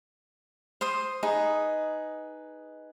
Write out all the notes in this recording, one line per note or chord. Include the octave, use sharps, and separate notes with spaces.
C5 C6 D#6
D#4 G#4 B4 D#5